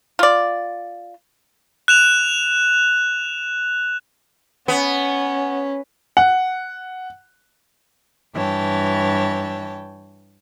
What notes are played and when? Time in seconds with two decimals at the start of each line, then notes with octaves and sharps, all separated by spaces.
0.19 F4 D5
1.88 F#6 E7 F7
4.68 B3 C#4
6.17 F#5
8.34 G2 E3 C#5 G5 A5